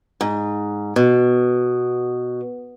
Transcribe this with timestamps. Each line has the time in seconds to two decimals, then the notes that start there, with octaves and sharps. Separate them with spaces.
0.21 G#2
0.96 B2